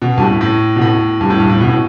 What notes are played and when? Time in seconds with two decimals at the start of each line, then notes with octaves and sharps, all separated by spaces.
0.02 B2
0.17 G2
0.22 A2
0.41 A2
0.76 B2
0.81 A2
1.21 G2
1.30 A2
1.40 G2
1.49 A2
1.61 B2
1.68 A2